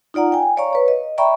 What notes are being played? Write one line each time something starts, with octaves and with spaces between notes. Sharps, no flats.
D#4 F4 D5 F#5 A#5
G5 G#5
C#5 D5 F5 A#5 C#6
B4 C#5
D#5
D5 E5 G5 A#5 B5 C#6